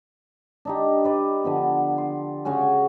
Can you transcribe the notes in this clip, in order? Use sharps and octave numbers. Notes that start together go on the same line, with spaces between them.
D4 D#4 G4
B4 D5 D#5
D3 F3 B3
C6
C#3 F#4 C#5 G#5